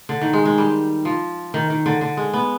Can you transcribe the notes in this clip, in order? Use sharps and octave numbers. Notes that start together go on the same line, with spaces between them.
D3
D#3
G#3
G#3
G3
F3
D#3
D#3
D3
D3
G#3
B3